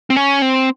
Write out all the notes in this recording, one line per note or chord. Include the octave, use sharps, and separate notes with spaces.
C4
C#4
C4